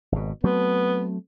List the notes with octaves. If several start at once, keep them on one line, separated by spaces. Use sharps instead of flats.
G#1 B2
F#3 A3 B3 C4